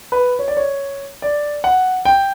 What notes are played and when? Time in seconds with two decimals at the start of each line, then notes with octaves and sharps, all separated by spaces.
0.12 B4
0.39 C#5
0.48 D5
0.57 C#5
1.22 D5
1.64 F#5
2.05 G5